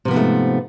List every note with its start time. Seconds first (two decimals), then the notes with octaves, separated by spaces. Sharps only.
0.05 C3
0.08 F3
0.11 B3
0.14 G#2
0.16 A3